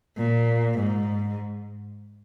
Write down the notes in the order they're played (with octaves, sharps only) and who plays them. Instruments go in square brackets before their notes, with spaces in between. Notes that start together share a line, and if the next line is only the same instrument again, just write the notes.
[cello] A#2
G#2